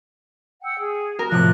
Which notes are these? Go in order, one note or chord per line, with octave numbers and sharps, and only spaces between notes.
F#5 G5 E6
G#4
F#4 A#4
A2 C3 F3 F#6